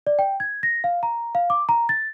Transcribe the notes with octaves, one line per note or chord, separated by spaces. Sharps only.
D5
G5
G#6
A#6
F5
A#5
F5
D6
A#5
A6